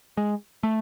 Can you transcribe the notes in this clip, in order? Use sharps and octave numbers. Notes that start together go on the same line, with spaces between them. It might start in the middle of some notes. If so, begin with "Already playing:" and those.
G#3
A3